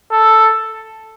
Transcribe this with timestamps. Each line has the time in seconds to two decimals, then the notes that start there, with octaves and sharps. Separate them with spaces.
0.12 A4